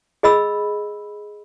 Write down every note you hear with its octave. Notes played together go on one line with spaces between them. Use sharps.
G#4 D#5 B5 E6